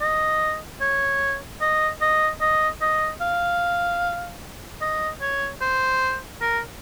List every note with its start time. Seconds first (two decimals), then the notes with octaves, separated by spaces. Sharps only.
0.02 D#5
0.81 C#5
1.61 D#5
2.02 D#5
2.41 D#5
2.82 D#5
3.21 F5
4.81 D#5
5.21 C#5
5.61 C5
6.41 A#4